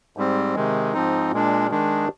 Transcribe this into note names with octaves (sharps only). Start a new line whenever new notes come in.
G#2 G3 C4
C3 D#3 G#3
G#2 F3 C4 D#4
A#2 G#3 D4
D#3 G#3 D4